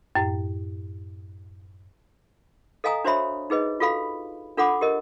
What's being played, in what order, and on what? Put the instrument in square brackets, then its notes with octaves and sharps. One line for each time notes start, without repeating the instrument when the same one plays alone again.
[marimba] F#2 A2
[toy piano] A4 D#5 F5 G#5 A#5 D#6
D4 F#4 C5 C#5 E5 B5
D#4 G#4 B4 D#5
F4 F#4 A4 F5 B5
D4 F4 A4 F#5 B5 D6
G4 A#4 D#5